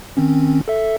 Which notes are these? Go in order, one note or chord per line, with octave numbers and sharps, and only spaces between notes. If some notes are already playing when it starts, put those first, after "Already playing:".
D#3 C4 C#4
A4 E5